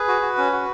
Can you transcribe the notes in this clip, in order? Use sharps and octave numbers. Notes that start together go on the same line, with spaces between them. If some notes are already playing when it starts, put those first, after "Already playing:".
Already playing: G#4 B4
F#4
F#4
C#4
F#4